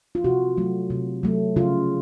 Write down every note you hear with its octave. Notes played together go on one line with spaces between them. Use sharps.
F4
C3 F#4
F#3 A3
C3
F#3 A3
C#3 F4